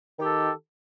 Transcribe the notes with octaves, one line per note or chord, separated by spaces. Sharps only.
D#3 G4 A4